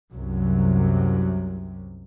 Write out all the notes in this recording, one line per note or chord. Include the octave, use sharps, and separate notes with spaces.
C2 F#2 C3 F#3